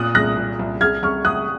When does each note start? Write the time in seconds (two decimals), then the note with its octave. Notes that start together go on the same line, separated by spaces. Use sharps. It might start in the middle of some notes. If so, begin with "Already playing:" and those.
Already playing: A#2 D#6 F#6
0.15 C2 F#6 A#6
0.37 A#2
0.59 C2
0.81 C2 F6 G#6
1.03 C2 C#6 F6
1.25 C2 D#6 F#6